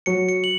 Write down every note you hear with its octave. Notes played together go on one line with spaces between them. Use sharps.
F#3 C#7
C#7
F#7